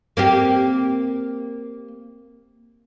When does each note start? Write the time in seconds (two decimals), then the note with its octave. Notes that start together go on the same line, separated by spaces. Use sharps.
0.17 A#3 C4 G4